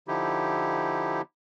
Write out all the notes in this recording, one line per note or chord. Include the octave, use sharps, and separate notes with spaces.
D3 F3 D#4 E4 G4